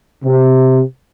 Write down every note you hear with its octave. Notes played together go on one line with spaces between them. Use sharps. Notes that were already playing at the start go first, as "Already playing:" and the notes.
C3